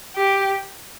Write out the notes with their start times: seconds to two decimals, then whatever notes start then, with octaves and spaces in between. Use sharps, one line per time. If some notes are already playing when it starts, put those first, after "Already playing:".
0.16 G4